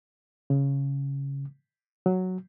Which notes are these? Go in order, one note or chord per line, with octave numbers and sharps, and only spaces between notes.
C#3
F#3